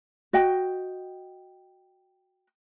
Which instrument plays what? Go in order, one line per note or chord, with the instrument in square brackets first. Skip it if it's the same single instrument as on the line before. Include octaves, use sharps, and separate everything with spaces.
[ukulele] F#4 D#5 G5